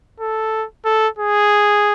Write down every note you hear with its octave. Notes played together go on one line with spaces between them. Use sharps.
A4
A4
G#4